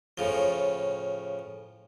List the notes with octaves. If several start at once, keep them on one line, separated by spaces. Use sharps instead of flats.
A2 C#3 F3